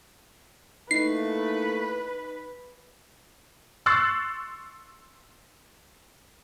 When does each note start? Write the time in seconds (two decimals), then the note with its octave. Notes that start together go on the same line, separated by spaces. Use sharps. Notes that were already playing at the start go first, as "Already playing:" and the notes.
0.91 A3 A#3 D#4 E4 B4 C7
3.86 C6 C#6 E6 F#6 A6 C7